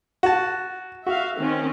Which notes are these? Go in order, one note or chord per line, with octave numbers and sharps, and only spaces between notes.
F#4 A5
F#4 E5 F5
D#3 C4 C#4